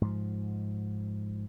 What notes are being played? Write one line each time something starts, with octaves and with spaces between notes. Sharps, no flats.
G#2 F3